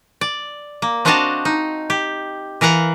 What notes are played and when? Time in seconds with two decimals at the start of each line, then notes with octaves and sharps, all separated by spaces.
0.21 D5
0.82 A#3
1.05 C4 D4 F#4 D#5 F5 A5
1.45 D#4
1.90 G4
2.61 E3 A#4 F5 F#5 A#5